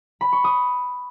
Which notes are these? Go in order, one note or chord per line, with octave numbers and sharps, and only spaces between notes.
B5
C#6
D#6